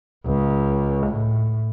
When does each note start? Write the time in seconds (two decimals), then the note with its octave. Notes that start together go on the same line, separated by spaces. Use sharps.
0.26 C#2
1.07 A2